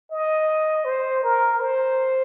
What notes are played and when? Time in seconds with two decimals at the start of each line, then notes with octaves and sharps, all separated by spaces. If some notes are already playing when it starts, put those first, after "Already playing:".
0.12 D#5
0.85 C5
1.23 A#4
1.60 C5